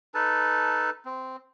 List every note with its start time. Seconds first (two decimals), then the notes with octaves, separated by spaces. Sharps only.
0.14 D#4 A4 B4 A5
1.05 C4